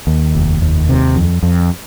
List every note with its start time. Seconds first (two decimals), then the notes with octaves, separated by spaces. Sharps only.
0.07 D#2
0.35 F1
0.62 D#2
0.89 C3
1.16 F2
1.43 F2